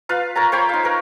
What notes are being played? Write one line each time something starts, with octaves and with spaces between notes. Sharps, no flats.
F4 B4 F5
A#4 C#5 A5 A#5
C5 C#5 G5 B5
D#4 F5
A#4 B4